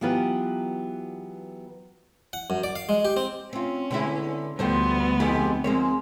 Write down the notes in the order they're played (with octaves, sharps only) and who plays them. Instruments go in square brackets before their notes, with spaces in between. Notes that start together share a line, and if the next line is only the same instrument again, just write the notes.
[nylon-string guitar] E3 F#3 B3 F4 G4 B4
[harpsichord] F#5
F#2
D5
F5
G#3
G4
C4
[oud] C4 F4 [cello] C#4
[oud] D3 G#3 E4 [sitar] B3
[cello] D2 B3 [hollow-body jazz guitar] G2 G5 [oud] D3 F3 A3 [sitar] C5
[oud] F2 [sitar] G#2 D#4 G4 [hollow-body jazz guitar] A3 A4
[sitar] G#2 [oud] F3 G#3 A#3 [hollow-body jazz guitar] C4 C#5